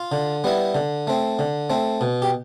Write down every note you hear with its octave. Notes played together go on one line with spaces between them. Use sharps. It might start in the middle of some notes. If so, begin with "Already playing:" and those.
Already playing: F4
D3
G3 B3 E4
D3
A3 C4
D3
A3 C4
B2
G4